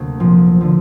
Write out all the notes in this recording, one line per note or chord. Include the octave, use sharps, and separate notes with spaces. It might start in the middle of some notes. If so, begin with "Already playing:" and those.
Already playing: D2 C3 A#3
A#2 F3 C4
D3 F3